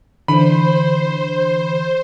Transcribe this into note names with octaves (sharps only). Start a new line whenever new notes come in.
D3 E3 C5 B5